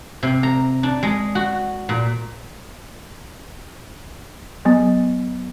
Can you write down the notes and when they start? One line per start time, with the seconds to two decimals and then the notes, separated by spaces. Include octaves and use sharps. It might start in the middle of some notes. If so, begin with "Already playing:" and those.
0.23 C3
0.43 A#5
0.83 D4
1.03 G#3
1.35 F#4
1.89 A#2
4.65 F#3 B3